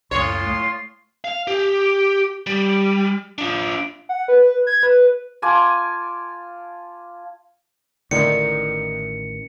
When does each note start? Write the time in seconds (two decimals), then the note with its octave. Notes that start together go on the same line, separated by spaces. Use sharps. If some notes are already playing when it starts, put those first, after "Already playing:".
0.11 C#2 F#2 A2 F4 C#5 C6
0.46 A3
1.24 F5
1.48 G4
2.47 G3
3.38 D4 F4
4.09 F#5
4.28 B4
4.67 G#6
4.83 B4
5.42 F4 G#5 A5 D6
8.11 A1 A2 D3 D#3 D#4 C#7